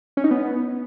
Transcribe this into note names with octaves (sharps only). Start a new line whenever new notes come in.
C#4
D#4
B3